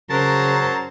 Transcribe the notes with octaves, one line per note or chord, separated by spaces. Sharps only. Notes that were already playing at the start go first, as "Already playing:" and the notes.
C#3 F#3 A#4 C5 A5